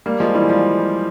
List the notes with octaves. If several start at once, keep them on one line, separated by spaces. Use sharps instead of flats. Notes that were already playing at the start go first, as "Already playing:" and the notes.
G3 A#3
F3 G#3
E3 G3
F3